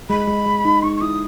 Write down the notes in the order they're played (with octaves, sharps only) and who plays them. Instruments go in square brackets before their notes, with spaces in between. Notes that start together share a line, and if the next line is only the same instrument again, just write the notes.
[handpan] G#3 [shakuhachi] B5
[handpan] G#3
G#3
D#4
[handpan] D#4 [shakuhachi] C#6
[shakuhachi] C#6
[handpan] E4 [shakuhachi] D#6